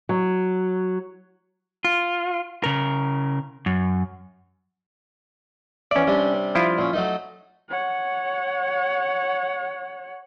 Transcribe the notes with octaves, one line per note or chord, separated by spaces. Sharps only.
F#3
F4
C#3 A#4
F#2
E2 C#4 D5 E5
C3 G3 D4
F3 E4 F4
A#2 C#4
F#3 A3 D#4
C#5 F#5